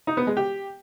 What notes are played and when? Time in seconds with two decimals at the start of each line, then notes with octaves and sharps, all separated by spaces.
0.07 D#4
0.17 B3
0.27 G#3
0.37 G4